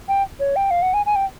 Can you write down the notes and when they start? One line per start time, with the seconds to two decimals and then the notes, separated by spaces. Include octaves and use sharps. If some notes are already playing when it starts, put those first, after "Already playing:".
0.08 G5
0.40 C#5
0.56 G5
0.71 F5
0.82 F#5
0.94 G#5
1.06 G#5
1.15 G5